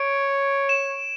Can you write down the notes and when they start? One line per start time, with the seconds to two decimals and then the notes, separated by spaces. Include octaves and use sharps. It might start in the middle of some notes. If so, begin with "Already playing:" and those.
Already playing: C#5 D7
0.69 E7